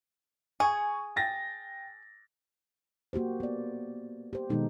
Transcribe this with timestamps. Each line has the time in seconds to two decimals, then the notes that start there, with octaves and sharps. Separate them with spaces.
0.60 G#4 G#5 C#6
1.16 G5 A6 A#6
3.13 A#3 F#4 G4 C5
3.40 B3 D5
4.33 G4 C5
4.50 B2 D#3 G#3 B3 D#4 A4